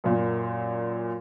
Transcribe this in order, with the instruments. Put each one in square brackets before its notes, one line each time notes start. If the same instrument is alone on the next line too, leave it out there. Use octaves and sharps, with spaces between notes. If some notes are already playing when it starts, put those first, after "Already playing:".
[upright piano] F#2 A#2